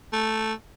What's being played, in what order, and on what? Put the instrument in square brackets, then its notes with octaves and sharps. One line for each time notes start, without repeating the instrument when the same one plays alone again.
[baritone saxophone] A3